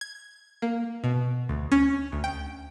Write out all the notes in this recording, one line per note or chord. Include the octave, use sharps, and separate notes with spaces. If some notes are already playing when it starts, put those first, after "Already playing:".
G#6
A#3
B2
D2
C#4
D2
G5